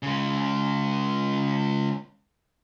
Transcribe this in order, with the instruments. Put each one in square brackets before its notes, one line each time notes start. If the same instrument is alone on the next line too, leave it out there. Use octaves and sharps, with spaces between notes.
[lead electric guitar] C#3 G#3